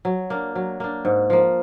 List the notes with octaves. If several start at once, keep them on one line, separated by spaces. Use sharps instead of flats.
F#3
A#3 D4
F#3
A#3 D4
G#2
F3 A#3